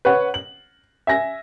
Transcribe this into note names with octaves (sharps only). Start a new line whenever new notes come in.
B4 C#5 F#5
F#7
E5 G#5 A#6